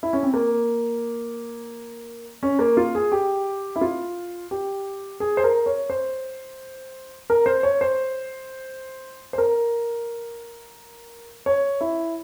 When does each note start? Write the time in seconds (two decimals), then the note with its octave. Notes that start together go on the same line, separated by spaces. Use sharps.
0.03 E4
0.13 C#4
0.23 C4
0.34 A#3
2.43 C#4
2.59 A#3
2.77 F4
2.95 G#4
3.12 G4
3.76 E4
3.81 F4
4.51 G4
5.20 G#4
5.37 C5
5.44 A#4
5.66 C#5
5.90 C5
7.30 A#4
7.46 C5
7.63 C#5
7.81 C5
9.33 C5
9.38 A#4
11.46 C#5
11.81 E4